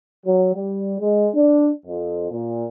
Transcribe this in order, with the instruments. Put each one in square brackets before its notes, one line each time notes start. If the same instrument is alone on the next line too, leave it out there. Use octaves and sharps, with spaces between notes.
[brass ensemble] F#3
G3
G#3
D4
F2
A#2